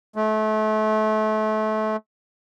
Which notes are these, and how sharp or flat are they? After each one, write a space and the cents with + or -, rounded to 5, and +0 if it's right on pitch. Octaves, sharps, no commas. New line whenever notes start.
A3 -30